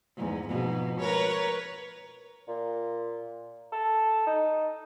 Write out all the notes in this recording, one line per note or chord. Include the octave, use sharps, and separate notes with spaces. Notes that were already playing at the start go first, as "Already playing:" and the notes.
E2 G#2
F2 G#2 B2
A#4 B4 C#5
A#2
A4
D#4